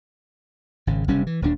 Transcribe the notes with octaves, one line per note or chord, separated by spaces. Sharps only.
G#1 C#3
F#1 C3 G3 C#4
E3
D#1 D#2 D4